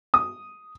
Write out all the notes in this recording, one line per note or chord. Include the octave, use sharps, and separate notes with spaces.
D#6